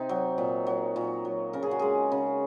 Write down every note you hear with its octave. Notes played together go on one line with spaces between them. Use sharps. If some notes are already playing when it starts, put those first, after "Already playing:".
Already playing: C3 D#4
F#3
A#2
F#3
A#2
F#3
C#3 A#4
G#4
F#4
G#3 G#4
C#3